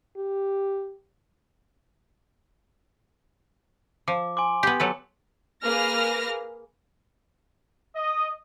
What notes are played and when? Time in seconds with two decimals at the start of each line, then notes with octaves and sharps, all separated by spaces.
0.17 G4
4.08 F3 D6
4.37 G#5 C6 D6
4.63 B3 G4
4.80 F#3 A4 B4
5.63 A#3 G#4 B4 F6 A#6
7.96 D#5